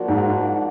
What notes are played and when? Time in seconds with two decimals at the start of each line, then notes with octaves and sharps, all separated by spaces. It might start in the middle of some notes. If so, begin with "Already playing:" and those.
Already playing: F3 A#3 D4 F#4
0.08 G#2